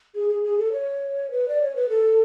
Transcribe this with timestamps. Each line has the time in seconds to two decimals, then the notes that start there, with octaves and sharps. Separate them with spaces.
0.15 G#4
0.29 G#4
0.44 G#4
0.58 A4
0.72 C#5
1.31 B4
1.48 D5
1.62 C#5
1.76 B4
1.89 A4